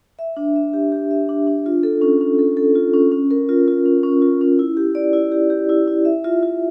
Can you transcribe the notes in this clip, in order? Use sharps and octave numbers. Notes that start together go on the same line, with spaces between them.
E5
D4
E5
G4
G4
E5
D4
D4
F4
A4
C#4
C#4
A4
A4
F4
C#4
C#4
A#4
F4
F4
C#4
C#4
F4
C#4
E4
G4
D5
E4
G4
G4
E4
E4
E5
F4
F4